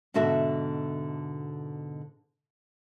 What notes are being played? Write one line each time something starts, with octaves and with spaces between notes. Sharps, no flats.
G#2 B2 D3 F#4 A4 E5